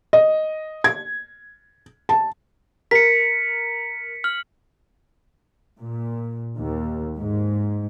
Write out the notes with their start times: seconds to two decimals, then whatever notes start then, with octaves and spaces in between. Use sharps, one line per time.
0.13 D#5
0.84 G#6
2.09 A5
2.91 A#4 B6 C#7
4.24 F6 F#7
5.80 A#2
6.58 D#2
7.19 G#2